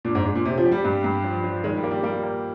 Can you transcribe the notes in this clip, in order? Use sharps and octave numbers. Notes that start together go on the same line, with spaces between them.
A#2 D4
G#2
G#3
A#2
C3 G4
F3
G4
G3
G2
G2
F3
F3
D#3 G#3
G3
A#3
G3
G3 A#3
A#3